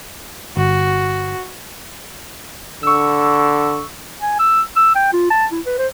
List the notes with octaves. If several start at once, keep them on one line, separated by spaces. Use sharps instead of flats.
G1 F#4
D3 C#6 E6
G#5
E6
E6
G5
F4
A5
E4
B4
C5